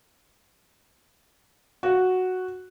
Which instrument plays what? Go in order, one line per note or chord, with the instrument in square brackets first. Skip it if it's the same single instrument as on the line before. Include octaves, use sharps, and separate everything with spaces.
[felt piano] F#4